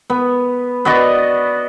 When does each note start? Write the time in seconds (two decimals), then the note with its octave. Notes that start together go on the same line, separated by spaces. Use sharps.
0.10 B3
0.85 B3 F#4 D5 D#5